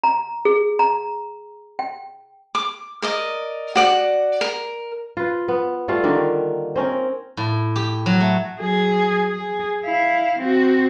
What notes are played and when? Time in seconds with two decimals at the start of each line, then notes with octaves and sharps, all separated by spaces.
0.04 A#5
0.45 G#4
0.79 A#5
1.79 G5
2.55 D6
3.02 A#4 D5 D#5
3.75 F#4 D5 F#5
4.41 A#4
5.17 F4 B4
5.48 B3
5.88 G3 A3 F4
6.04 D3 D#3 A#3
6.76 C4 C#4 A#4
7.37 A2
7.76 G4
8.06 F#3
8.20 A3
8.59 F#3 G#4
9.29 G#4
9.84 E4 F5
10.40 C4 F#4